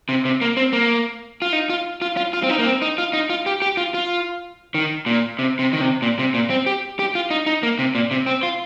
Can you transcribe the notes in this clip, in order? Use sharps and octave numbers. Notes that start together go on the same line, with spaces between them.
C3
C3
A#3
C4
A#3
F4
D#4
F4
F4
F4
F4
C4
D#4
A#3
C4
D#4
F4
D#4
F4
G4
G4
F4
F4
D#3
A#2
C3
C3
D#3
C3
A#2
C3
A#2
C4
G4
G4
F4
D#4
D#4
A#3
C3
A#2
C3
C4
F4